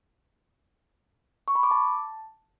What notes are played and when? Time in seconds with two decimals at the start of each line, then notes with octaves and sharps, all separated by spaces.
1.48 C#6
1.55 B5
1.63 D6
1.71 A5